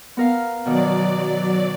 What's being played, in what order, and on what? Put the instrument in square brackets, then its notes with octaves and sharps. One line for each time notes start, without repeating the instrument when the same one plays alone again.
[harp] B3 A#4 F5
[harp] B2 D#3 [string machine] F#3 D5